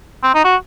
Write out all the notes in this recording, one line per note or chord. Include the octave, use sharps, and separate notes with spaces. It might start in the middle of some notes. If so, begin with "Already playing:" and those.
C4
D#4
F#4